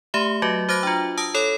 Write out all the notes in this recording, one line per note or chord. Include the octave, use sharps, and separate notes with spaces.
A3 G4 E5 B5
F#3 F#4 D#5
F#4 C5 D6 F#6 A#6
D4 F4
A5 D#6 E6 A#6
A4 C#5 B5 D#6